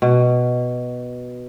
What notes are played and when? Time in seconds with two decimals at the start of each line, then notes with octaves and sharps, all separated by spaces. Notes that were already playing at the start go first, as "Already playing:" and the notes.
0.02 B2